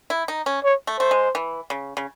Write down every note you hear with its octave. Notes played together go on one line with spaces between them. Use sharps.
E4
D#4
C#4
C#5
A3
A3 C5
G#3
E3
C#3
C#3